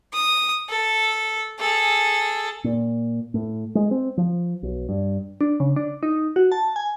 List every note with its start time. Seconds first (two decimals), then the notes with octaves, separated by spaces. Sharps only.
0.13 D#6
0.69 A4
1.59 G#4 A4
2.64 A#2
3.34 A2
3.75 G#3
3.91 C4
4.18 F3
4.63 B1
4.89 G2
5.41 D4
5.60 C#3
5.76 D4
6.03 D#4
6.36 F#4
6.52 A5
6.76 G#5